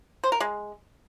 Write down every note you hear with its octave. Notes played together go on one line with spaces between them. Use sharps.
C5
A#4
G#3